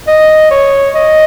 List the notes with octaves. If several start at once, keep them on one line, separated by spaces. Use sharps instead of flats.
D#5
C#5
D#5